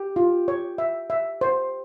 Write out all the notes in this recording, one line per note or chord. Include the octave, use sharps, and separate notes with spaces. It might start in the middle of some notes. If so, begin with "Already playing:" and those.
Already playing: G4
F4
C#5
E5
E5
C5